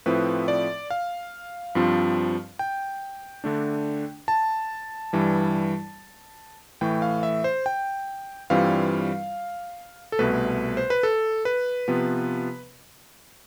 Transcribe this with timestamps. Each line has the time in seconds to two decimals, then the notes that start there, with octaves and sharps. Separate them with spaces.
0.06 A2 F3 C4 E4 B4
0.48 D5
0.90 F5
1.75 G2 F3 C4 F4
2.59 G5
3.44 D3 A3 D4
4.28 A5
5.13 G2 E3 G3
6.81 A2 E3 A3 G5
7.02 F5
7.23 E5
7.44 C5
7.66 G5
8.50 G2 E3 G3 C4 F4 F5
10.12 A4
10.19 C2 B2 A3 B4
10.77 C5
10.90 B4
11.03 A4
11.45 B4
11.88 C3 F3 B3